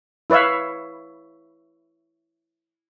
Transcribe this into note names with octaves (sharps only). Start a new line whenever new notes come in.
E4 B4 C#5 E5 F5